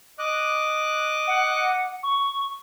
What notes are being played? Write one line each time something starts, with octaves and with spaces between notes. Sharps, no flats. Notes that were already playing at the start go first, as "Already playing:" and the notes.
D#5 D6 F#6
F#5
C#6